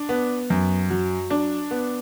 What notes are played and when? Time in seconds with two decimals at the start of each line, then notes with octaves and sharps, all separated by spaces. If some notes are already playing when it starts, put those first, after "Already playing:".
Already playing: D4
0.09 B3
0.50 F#2
0.90 F#3
1.30 D4
1.71 B3